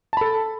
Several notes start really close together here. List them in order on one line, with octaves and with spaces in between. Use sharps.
A5 B5 A4